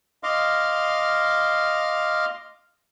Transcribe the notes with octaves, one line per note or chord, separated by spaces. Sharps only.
D#5 F5 C6 D6 F6